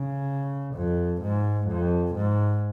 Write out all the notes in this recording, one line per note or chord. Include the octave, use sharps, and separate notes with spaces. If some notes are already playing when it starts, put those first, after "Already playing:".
Already playing: C#3
F2
G#2
F2
G#2